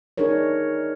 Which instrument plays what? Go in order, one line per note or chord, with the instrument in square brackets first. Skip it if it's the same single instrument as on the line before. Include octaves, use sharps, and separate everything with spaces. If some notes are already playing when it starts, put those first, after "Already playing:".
[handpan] D4 D#4 G#4 A#4 C#5